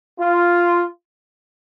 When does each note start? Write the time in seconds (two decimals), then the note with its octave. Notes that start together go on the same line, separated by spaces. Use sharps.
0.19 F4